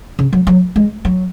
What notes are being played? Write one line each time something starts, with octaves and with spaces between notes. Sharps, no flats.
C#3
F#3
F#3
G#3
F#3